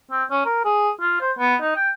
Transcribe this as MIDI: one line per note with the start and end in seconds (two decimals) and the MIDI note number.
0.11 0.24 60
0.31 0.41 61
0.45 0.61 70
0.65 0.90 68
1.01 1.20 65
1.21 1.31 72
1.39 1.56 59
1.61 1.74 63
1.76 1.90 79